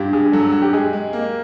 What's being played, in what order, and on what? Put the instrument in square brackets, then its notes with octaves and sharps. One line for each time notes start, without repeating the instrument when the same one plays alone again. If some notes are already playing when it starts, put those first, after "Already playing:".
Already playing: [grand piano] G2 [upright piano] F4 G4
[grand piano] G2 [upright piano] G#4
[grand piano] F#3 [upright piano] A4
[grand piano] F#3
[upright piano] G4
[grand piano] G#3 [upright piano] G#4
[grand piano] G#3
A#3